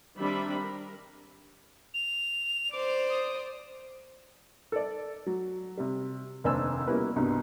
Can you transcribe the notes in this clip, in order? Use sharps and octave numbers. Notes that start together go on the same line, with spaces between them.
D#3 G3 C4 D4 E5 B5
A#4
F7
C5 D5 D6
D#6
A4 D5
F#3
C3 G3
F1 D#2 D4 C5 G#5 E6
B2 G3 A#3 C#4 E4 B4
C2 G2 B2